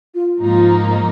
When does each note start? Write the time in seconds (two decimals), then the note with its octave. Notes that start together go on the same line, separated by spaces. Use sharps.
0.15 F4
0.42 G#2 F3 A#3 D#4 F4